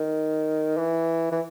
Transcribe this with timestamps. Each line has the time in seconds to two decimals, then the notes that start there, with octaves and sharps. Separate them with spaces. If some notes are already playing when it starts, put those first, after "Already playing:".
Already playing: D#3
0.77 E3
1.32 E3